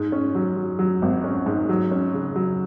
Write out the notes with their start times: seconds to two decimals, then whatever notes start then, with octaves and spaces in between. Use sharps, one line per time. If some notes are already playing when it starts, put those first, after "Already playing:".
Already playing: G#2
0.12 C#4
0.35 F#3
0.57 F#3
0.79 F#3
1.02 G#1
1.24 C#4
1.46 G#2
1.69 F#3
1.91 C#4
2.14 C#3
2.36 F#3